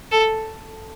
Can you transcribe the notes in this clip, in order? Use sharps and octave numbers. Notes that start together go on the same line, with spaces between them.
A4